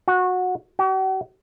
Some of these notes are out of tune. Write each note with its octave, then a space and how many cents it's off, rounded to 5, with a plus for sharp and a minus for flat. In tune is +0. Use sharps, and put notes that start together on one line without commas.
F#4 -20
F#4 +45